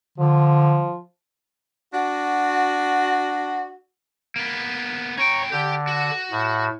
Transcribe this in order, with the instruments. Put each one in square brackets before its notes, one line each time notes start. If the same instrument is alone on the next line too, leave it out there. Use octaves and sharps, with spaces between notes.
[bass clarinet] D3 [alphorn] F3
[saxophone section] D4 F#4
[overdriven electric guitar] A#3 B3
[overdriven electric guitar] C#4 G5 [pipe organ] C#5 A#5 C#6
[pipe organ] D3 [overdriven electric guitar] G4 G5
[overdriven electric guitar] F#4
[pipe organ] A2